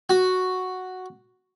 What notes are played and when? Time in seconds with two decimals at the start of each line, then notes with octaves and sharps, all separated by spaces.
0.10 F#4